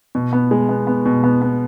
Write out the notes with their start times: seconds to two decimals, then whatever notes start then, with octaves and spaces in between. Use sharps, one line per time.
0.15 B2
0.33 B3
0.51 G#3
0.69 B3
0.87 B3
1.05 B2
1.24 B3
1.42 B3